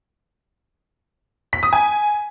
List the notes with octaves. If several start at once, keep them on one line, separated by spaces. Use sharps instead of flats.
B6
D#6
G#5